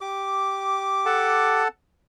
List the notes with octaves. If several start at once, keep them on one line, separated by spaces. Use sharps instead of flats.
G4 D6
A4 F#5 A5